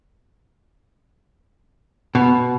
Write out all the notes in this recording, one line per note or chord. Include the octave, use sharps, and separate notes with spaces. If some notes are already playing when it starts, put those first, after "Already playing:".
B2